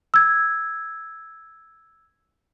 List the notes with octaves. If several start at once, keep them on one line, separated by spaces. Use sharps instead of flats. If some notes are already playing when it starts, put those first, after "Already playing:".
E6 G#6